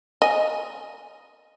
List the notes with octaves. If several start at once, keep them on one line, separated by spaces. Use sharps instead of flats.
D#5 G#5